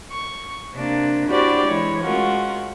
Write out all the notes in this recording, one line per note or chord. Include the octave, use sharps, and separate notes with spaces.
C#6
C3 A#3 D4
D4 E4 F#4 G4 C5 D5
E3 G#3 E4 C#5
G#3 A3 C#4 F4 F#4 A#4